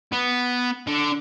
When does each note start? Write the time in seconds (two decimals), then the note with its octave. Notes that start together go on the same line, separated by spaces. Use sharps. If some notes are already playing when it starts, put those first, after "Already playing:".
0.12 B3
0.87 D3